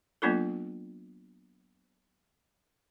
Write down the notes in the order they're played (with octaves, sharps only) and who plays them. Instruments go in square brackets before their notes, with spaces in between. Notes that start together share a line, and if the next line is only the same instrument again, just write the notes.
[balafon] F#3 A#3 B3 D4 F4 A4